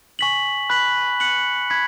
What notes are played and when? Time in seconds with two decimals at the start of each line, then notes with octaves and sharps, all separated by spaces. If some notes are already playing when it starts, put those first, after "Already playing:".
0.19 G#5 C#6 B6 F#7
0.70 B5 F#6 B6 F#7
1.20 F#6 C#7 F#7
1.70 B5 G#6 B6